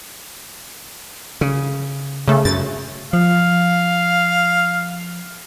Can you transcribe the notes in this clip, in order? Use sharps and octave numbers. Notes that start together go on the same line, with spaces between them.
C#3
C#3 A3
F#2 A6
F3 F5